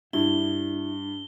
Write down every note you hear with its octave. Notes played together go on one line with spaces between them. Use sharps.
G2 D4 E4 G7